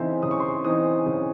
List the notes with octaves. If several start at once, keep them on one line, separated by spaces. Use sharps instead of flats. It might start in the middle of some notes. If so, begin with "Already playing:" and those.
Already playing: C#3 E3 C4 D#4 A4 E5
C#3 D#6
C#6
C6
C#6
E3 C4 D#4 D#6
C#3